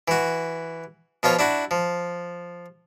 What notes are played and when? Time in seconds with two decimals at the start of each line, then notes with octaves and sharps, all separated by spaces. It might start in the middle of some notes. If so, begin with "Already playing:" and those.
0.08 E3 F#4
1.23 B2 F3 F4 C#5
1.39 D4 E4 F#4
1.71 F3